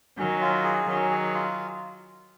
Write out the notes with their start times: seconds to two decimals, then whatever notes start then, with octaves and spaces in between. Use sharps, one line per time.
0.17 D#3 F#3 C#4
0.41 F4
0.64 G#4
0.88 D#3 F#3 C#4
1.11 G#4
1.34 F4